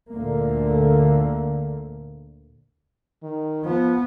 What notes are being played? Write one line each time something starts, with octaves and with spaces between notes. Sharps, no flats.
D2 A#2 D3 A3 A#3
D#3
F3 B3